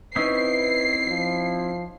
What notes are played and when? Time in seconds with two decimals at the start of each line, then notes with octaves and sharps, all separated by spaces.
0.16 C4 C#4 D#4 E4 B4 E5 C7
1.08 F3